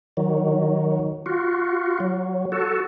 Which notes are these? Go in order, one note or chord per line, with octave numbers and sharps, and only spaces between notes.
D#3 F#3
F4 F#4
F#3
F#4 A4